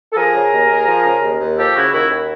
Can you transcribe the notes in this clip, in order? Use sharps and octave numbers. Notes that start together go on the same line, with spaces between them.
A4
F3 G#4 A#4
C#3
D#2
D#2
F3
C#3
D#2
D#2
F3 G4 A4
C#3 E4 F#4
D#2 E4 F#4
D#2